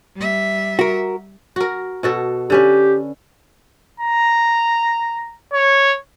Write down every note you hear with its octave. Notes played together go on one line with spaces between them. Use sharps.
G3 E5
F#4 A#4
F#4 A#4
B2 F#4 A4
D3 C#4 G4 B4
A#5
C#5